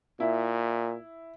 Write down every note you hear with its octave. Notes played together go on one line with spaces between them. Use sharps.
A#2 E4